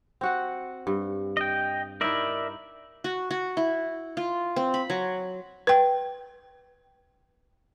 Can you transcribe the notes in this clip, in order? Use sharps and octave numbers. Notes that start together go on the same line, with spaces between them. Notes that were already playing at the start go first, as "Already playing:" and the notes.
C4 F#4 F#5
G2
D#5 G5
D#4 E4 A#4 D5 E5
F#4
F#4
E4
F4
C4
B5
F#3
B4 G5